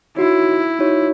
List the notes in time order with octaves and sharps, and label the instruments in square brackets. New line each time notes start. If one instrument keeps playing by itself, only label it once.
[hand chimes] D#4 F#4 C#5 [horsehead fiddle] E4
[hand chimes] D#4 F#4 C#5